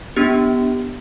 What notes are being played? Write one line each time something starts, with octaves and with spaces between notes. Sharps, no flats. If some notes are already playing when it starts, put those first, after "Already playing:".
B3 D4 G4